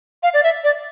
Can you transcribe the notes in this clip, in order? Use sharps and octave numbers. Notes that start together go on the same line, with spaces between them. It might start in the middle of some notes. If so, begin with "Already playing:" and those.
F5
D5
E5
D5